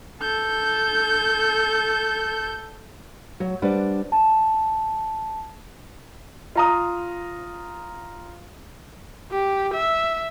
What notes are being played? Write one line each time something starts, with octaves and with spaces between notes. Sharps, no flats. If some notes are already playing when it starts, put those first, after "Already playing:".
A4 G6
F#3
G3 D4 B4 C5 F#5
A5
F4 A#5 D#6
G4
E5